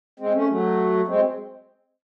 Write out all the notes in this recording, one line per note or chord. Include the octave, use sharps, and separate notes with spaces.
G#3 C4
A3 C#4
F#3 A3
G#3 C4